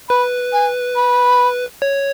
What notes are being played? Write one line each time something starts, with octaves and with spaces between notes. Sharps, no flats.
B4 B5
G#5
B5
C#5